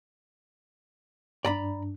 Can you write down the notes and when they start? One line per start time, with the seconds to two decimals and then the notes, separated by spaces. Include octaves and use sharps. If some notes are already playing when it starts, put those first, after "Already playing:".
1.45 G2 D4 D5 A#5 B5